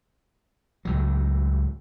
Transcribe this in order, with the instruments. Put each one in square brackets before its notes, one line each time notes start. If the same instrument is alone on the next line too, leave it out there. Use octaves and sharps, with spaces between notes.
[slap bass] C#2 A2 F#3